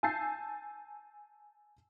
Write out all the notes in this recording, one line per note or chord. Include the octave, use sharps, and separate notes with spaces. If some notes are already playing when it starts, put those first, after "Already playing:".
G#5 A5 E6 G6 A6 C7